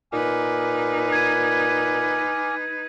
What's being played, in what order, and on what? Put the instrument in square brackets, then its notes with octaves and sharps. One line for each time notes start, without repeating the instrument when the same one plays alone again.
[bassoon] A#2 [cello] D#4 B4 [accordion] G#5 D6 F6
[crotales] G#6 D#7